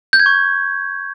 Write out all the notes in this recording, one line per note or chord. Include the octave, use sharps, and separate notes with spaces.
G6
G#6
C#6